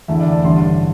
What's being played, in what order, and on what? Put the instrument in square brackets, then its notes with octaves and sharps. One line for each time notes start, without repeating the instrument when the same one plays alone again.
[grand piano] E2 D3 A3 E4 E5
D5
A5
A1 G2 D3 C6